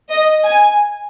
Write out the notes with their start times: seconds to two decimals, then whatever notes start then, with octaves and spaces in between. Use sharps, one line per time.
0.10 D#5
0.45 G#5